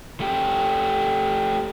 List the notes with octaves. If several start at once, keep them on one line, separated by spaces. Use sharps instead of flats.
A3 G4